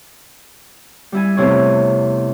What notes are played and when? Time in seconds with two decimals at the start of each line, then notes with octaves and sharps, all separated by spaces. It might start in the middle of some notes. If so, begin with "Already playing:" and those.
1.12 G3 E4 G#5
1.37 E2 A2 C3 E4 C#5